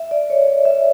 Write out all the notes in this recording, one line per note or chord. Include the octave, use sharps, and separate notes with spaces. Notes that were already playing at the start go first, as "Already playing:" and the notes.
Already playing: E5
D5
C#5
D5
E5